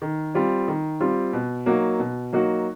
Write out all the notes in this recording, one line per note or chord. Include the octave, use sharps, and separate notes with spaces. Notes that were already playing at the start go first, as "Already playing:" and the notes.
D#3
G3 C4 F4
D#3
G3 C4 F4
B2
F#3 A#3 D#4 F#4
B2
F#3 A#3 D#4 F#4